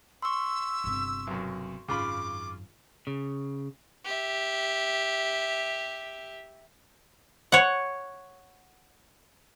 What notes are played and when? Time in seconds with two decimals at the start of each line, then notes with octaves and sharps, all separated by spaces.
0.22 C6 C#6 E6
0.84 G1 C3
1.27 B1 F#2
1.88 G#1 F#2 C#3 F4 B5 D6
3.07 C#3
4.04 G4 E5
7.52 C#5 F#5